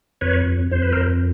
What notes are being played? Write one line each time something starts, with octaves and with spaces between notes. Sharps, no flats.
F2 B4 C#5
F2
F2 C5
B4
A#4 C5
F2